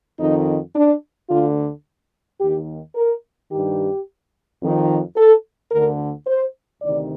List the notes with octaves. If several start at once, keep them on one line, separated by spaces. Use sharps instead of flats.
F2 D#3 D#4
D4
D2 D3 F4
D#2 D#3 G4
A#4
G2 D#3 G4
F2 D#3
A4
D2 D3 A#4
C5
D2 C3 D#3 D5